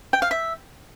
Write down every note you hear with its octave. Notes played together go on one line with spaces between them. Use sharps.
G5
F5
E5